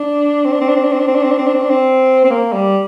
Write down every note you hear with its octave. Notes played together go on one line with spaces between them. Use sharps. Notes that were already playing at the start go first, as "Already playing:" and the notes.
Already playing: D4
C4
D4
C4
D4
C4
D4
C4
D4
C4
D4
C4
D4
C4
D4
C4
D4
C4
C4
A#3
G3